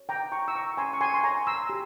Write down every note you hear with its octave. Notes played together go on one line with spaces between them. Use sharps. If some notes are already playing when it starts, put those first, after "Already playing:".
Already playing: C#5
G5 A#5
E4 A#5 C#6
E6
A#5 C#6
C#4 G#5 C6
C#6
G#5 C6
C6
C#5 A#5 C#6
C6 E6
G4